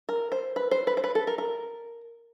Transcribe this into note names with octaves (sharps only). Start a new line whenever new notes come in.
A#4
C5
B4
C5
B4
C5
B4
A4
A#4
A#4